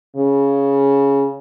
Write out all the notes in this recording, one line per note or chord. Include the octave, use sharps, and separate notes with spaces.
C#3